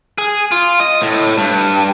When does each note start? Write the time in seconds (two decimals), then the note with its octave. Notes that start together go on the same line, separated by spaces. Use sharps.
0.18 G#4
0.52 F4
0.80 D#5
1.01 A2
1.38 G2